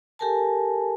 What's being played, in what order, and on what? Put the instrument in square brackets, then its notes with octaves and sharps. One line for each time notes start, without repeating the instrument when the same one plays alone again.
[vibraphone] G4 A4 A#4 G#5 A5